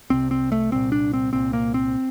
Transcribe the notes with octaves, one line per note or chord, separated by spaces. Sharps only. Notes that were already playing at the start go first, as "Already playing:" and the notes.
C2 C3 C4
C4
A3
C2 A#2 C4
D4
C4
C2 A#2 C4
A#3
C4